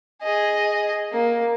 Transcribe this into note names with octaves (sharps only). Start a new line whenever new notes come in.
G#4 D#5
A#3